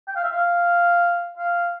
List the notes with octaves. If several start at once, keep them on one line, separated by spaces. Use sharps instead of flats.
G5
F5
E5
F5
F5